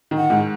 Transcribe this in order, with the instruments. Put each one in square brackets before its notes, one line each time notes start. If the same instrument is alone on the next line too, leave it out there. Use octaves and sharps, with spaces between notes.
[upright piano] D#3
[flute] F#5
[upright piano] G#2